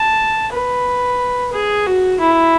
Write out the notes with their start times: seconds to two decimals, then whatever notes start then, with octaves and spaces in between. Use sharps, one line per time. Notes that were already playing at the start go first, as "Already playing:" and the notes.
Already playing: A5
0.53 B4
1.53 G#4
1.87 F#4
2.21 E4